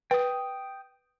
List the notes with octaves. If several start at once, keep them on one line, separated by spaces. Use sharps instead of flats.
B4 G5 D#6